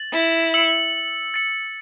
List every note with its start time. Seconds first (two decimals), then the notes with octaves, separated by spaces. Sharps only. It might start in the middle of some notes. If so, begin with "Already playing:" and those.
Already playing: A6 F#7
0.13 E4
0.54 E6 C#7 F#7
1.34 A6 C#7 F#7